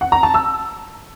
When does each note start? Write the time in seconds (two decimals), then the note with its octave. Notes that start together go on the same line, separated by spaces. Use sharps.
0.01 F#5
0.12 A#5
0.23 A5
0.34 E6